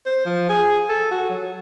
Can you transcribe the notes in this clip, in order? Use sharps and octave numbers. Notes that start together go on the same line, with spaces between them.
C5
F3
G#4
A4
F#4
F#3